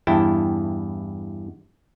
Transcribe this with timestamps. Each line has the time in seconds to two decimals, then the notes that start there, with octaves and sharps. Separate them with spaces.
0.07 E2 G2 E4 G5 A5